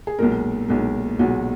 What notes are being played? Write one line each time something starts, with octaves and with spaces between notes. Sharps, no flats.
G#4
B1 A#2 G#3 A#4
B1 A#2 G#3
B1 A#2 G#3 F#4